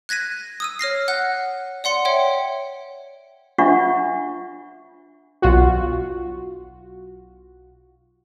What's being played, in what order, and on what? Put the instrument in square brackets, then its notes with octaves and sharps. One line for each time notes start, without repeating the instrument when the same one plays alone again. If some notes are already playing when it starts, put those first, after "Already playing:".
[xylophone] F#6 G#6 A#6 B6 D#7
D#6 E6 D#7
C#5 F6 A#6 C7
F#5 F#6
D5 F#5 C6 C#7
C#5 E5 G5
[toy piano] D4 F4 E5 F#5 C#6
[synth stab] B1 F4 F#4